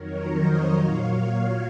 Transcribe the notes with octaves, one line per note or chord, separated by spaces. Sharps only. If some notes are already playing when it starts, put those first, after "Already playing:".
Already playing: F2 D#3 F#3 A#4 C#5
C5 D#5
A#2 F#3 C#5 F5